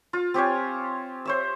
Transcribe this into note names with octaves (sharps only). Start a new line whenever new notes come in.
F4
C4 G4 C#5 G#5
C5 C#5 E5